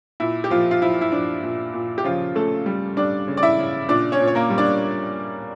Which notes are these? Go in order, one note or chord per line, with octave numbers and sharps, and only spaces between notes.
A#2 E4
G4
A#2 F3 F4
F4
F3 E4
E4
F3 D4
A#2
A#2
G4
C#3 F3 F4
C#3 A3 A4
G3
G3 D4 D5
C#3
D5
E4 E5
C#3
A#2 D4 D5
C#4 C#5
A#2
C#5
A#3 A#4
G3
D4 D5